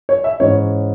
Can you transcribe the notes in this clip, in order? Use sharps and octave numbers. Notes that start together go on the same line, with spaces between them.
C#5
E5
G#2 E3 C#4 C#5